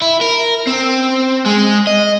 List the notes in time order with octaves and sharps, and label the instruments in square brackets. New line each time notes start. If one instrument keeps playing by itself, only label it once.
[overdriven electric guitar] E4
A#4
C4
G#3
D#5